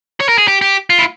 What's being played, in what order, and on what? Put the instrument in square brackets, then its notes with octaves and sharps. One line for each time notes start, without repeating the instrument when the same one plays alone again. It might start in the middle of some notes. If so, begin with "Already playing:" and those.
[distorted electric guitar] C#5
A#4
G#4
G4
G4
F4
E4